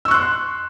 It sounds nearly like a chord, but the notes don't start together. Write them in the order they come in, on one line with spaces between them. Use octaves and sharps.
E6 C#6 F#6 C6